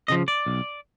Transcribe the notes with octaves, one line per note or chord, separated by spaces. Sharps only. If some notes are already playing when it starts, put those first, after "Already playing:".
C#3 F3 D#5
D5
B1